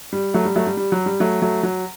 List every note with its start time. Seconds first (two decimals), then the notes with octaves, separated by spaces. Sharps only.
0.13 G3
0.34 F#3 A3
0.45 G3
0.56 F#3 A3
0.67 G3
0.77 G3
0.92 F#3
1.06 G3
1.20 F#3 A3
1.42 F#3 A3
1.63 F#3